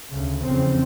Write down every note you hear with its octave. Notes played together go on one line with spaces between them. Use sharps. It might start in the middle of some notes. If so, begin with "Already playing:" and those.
D2 C#3
F1 E2 C#3 C4